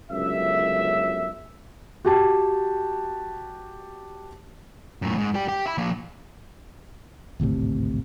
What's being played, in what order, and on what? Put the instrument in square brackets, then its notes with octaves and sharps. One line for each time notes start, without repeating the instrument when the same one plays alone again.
[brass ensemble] G1 C#2 F#2 E5
[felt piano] F#4 G4 A5
[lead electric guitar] F#2 A2
F2 G#2
G3 G4
G4 G5
E5 B5
F3 A#3
[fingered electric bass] G#1 D2 A2 C3